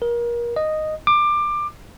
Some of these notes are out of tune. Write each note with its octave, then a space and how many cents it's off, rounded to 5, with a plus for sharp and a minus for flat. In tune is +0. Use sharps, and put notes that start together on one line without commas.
A#4 +30
D#5 -5
D6 +20